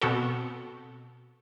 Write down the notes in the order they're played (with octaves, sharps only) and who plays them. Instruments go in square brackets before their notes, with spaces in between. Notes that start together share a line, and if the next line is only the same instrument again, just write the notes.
[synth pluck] B2 C4 F#4 A4